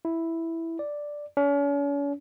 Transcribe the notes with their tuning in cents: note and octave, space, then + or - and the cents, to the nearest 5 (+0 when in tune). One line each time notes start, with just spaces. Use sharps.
E4 +0
D5 +0
C#4 +40